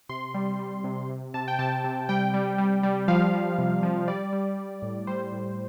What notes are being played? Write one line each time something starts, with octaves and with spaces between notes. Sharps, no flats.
C3 C6
G3
G3
C3
C3
C3 A5
G5
C3 A5
C3
G3 G5
G3
G3
G3
F3 F5
F3
C3
F3
G3 D5
G3
G3
A2
G3 C5
A2